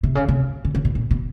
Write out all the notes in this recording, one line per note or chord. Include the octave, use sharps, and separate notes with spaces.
C3
C#3
C3
C#3
C#3
B2
A#2
B2